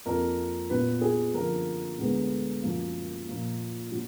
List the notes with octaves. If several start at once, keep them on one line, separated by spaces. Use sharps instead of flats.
F2 F3 A#3 A#4
A#2 F#3 B3 B4
G#4
F#2 D3 F3 A#3 A#4
D2 D3 G#3 B3
F#2 F3 A#3
A#2 F3 A#3
F#3